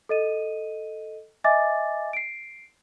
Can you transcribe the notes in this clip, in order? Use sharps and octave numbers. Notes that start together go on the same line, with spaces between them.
A4 D#5 D#7
D#5 E5 G#5 D6 A6
C7 D7